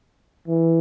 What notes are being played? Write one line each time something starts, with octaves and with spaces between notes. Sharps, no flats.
E3